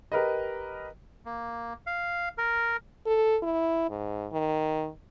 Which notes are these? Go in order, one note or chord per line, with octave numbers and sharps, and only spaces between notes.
G4 A#4 B4 D#5
A#3
F5
A#4
A4
E4
G#2
D#3